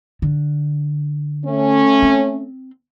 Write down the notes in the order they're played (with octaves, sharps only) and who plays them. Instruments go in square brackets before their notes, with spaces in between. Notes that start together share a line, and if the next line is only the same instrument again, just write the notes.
[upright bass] D3
[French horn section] A3 C#4
[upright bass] C4